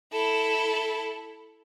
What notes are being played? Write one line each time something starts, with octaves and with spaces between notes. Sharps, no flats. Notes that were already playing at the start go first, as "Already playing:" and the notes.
E4 A4